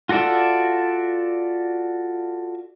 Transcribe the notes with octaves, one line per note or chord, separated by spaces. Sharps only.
F4 F#4 A4 D5 E5